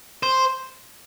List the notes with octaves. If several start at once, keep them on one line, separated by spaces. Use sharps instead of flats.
C5